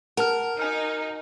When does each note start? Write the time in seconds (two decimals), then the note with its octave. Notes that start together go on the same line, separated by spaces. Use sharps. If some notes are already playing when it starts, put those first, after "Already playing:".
0.17 A#4 F#5 A5 F6
0.59 D#4 F#4 G#5 F6